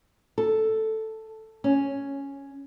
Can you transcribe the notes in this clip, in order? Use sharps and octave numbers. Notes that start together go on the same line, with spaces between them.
A4
C#4